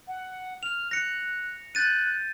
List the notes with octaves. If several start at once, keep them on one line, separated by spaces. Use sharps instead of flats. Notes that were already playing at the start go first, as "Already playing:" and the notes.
F#5
F6 F7
F#6 A#6 C#7
F#6 G6 A6 D#7